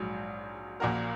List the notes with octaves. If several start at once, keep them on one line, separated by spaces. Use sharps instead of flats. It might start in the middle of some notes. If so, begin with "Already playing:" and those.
Already playing: A#1 G#2 F#3
A#1 A#2 A#3 F#4 A#4